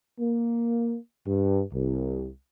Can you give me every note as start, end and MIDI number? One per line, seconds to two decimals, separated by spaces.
0.20 0.96 58
1.26 1.62 43
1.72 2.28 36